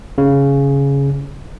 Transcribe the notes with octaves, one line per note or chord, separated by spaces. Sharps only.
C#3